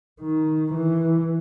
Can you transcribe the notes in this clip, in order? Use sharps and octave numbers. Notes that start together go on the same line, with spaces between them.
D#3
E3